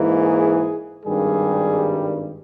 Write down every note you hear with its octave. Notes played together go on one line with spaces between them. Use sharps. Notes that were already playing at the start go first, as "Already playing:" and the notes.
Already playing: G#2 E3 A#3
G#4
G#1 G2 D#3 G3 G#4